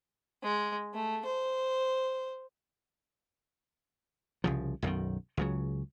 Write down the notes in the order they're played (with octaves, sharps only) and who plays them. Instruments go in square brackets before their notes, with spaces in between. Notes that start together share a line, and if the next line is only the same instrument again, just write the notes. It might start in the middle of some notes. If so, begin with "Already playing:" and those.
[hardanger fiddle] G#3
A3
C5
[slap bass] C2 C#3 F3
B1 F#2 B2 D#3
C#2 C#3 F#3